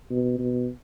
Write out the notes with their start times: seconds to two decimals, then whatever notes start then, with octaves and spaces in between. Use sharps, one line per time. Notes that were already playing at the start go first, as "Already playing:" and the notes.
0.10 B2
0.38 B2